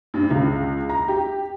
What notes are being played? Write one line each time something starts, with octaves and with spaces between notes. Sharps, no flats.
G2
C#2
A#5
G4